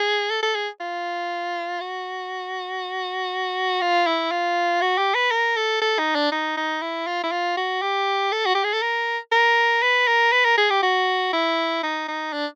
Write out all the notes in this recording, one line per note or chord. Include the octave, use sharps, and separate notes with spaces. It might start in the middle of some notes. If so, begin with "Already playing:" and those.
Already playing: G#4
A4
A4
G#4
F4
F#4
F4
E4
F4
F#4
G4
B4
A#4
A4
A4
D#4
D4
D#4
D#4
E4
F4
E4
F4
F#4
G4
A4
F#4
G4
G#4
A4
A#4
A#4
B4
A#4
B4
A#4
G#4
G4
F#4
E4
D#4
D#4
D4